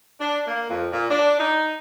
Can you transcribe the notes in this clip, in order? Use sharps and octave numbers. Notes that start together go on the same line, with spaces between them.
D4
A#3
F2
A#2
D4
D#4